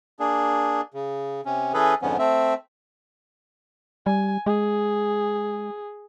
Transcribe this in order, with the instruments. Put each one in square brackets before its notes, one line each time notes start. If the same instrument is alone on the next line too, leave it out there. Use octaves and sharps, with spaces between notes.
[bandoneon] A#3 D4 G#4
C#3
C3 C#4
E3 C#4 G#4 A4 B4
F2 G#2 D3 F3 B3 C#4
A3 C4 E5
[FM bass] G3 [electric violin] G#5
[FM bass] G#3 [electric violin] G#4